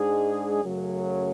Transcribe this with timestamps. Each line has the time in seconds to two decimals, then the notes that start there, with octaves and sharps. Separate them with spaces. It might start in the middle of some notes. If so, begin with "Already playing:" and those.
Already playing: G#2 G#3 D4 G#4
0.62 F#2 C#3 F#3 A3